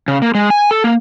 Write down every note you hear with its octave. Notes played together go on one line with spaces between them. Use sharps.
C#3
A#3
G#3
G#5
A4
A#3